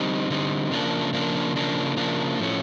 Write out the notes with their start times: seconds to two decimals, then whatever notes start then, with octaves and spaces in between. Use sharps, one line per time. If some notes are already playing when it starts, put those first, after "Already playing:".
Already playing: D3 G3 C4 D#4
0.30 D3 G3 C4 D#4
0.71 C#3 F3 A#3 D4
1.13 C#3 F3 A#3 D4
1.56 C#3 F3 A#3 D4
1.97 C#3 F3 A#3 D4
2.39 A2 F3 A3 C#4